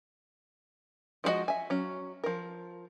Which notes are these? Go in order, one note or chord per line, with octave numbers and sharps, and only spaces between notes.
F3 G#3 A#3 F#4 D#5
E5 G#5
F#3 C#4
F3 A#4